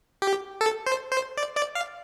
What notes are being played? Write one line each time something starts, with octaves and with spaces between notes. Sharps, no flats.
G4
A4
C5
C5
D5
D5
F5